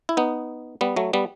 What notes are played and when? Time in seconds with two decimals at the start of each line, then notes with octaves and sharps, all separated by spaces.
0.09 E4
0.17 B3 D#4
0.81 G3 B3
0.96 F#3 A3
1.13 G3 B3